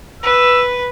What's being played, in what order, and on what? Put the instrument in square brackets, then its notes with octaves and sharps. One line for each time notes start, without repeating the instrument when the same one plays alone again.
[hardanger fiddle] B4 [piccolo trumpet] E6